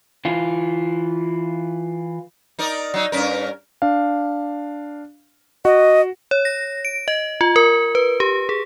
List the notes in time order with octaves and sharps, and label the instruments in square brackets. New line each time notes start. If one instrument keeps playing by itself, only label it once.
[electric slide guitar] E3 F4
[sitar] D#4 A#4 D5
F#3 D#4
G2 C#4 A#4
[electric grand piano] D4 F5
[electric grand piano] F#4 F#5 [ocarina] D#5
[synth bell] C#5
A#6
D7
D#5
F4
A#4
B4
G4
G#4